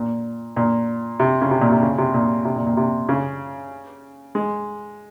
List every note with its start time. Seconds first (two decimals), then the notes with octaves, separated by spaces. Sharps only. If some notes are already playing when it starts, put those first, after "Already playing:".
Already playing: A#2
0.56 A#2
1.20 C3
1.41 C#3
1.51 C3
1.61 A#2
1.72 C3
1.83 C#3
1.98 C3
2.14 A#2
2.45 C3
2.56 A#2
2.67 A#2
2.77 C3
3.09 C#3
4.35 G#3